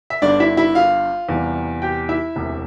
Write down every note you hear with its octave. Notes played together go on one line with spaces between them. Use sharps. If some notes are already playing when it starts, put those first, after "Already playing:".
E5
G1 G2 D3 D4 D5
E4 E5
E4 E5
F4 F5
E2 C3 G3
G4 G5
E4 E5
E1 D2 C3